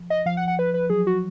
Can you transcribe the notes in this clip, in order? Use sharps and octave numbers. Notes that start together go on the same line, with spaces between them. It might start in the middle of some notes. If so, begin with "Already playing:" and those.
Already playing: F3
D#5
F3 F5
F#5
F#5
B4
B4
F#3 G#4
F#4